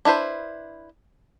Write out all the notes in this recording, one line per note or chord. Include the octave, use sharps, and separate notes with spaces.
D4 E4 B4 C5